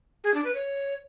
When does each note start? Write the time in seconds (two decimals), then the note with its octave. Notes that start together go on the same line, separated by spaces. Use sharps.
0.24 G#4
0.34 D4
0.45 B4
0.55 C#5